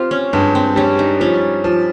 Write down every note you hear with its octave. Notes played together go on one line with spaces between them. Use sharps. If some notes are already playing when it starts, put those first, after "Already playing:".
Already playing: C4 F4 G4
C#4
G2 G#3
C4
G3 C#4
D#4
F3 C#4
F3